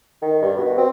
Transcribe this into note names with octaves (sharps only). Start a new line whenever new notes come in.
D#3
G2
B2
C4